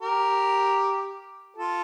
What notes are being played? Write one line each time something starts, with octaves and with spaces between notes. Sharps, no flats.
G4 A#4
F4 A4